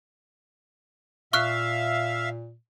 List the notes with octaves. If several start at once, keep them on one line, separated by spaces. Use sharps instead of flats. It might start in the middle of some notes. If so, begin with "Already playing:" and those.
A#2 E5 F5 C#6 F6 F#6